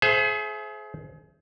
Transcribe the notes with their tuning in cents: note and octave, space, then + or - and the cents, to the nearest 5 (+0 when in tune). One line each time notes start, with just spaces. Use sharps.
G#4 +35 C5 +0 E5 +25